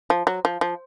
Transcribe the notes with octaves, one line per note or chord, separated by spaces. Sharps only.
F3
F#3
F3
F3